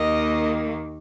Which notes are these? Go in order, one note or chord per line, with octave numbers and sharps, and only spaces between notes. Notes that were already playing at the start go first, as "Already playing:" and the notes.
Already playing: D#2 D#3 A#3 D#5